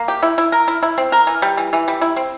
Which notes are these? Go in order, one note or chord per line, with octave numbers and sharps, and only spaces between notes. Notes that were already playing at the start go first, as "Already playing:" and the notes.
Already playing: A#3
G4
E4
E4
A#4
E4
E4
C4
A#4
E3
G3
E3
E3
G3
E4
C4